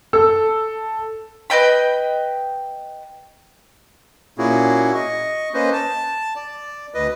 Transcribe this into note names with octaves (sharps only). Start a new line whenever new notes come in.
A4 E6
B4 D#5 G5 B5
A#2 A#3 C#4 E4 F#4 G#4
D#5 C#6
A#3 C#4 B4 C5 D#5
A5
D5
D2 B4 D#5